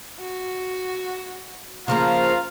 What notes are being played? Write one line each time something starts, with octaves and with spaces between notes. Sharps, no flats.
F#4
C#3 F3 A#3 F4 F5 A#5